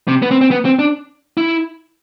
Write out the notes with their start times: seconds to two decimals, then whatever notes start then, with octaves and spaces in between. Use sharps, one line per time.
0.08 C3
0.22 B3
0.31 C4
0.41 C4
0.51 B3
0.65 C4
0.79 D4
1.38 E4